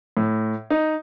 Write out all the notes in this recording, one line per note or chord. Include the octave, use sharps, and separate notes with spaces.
A2
D#4